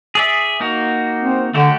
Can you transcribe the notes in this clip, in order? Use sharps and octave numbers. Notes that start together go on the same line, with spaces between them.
G#4 D5 E5
A#3 D#4 F#4
C4
D3 A3 F#4 G4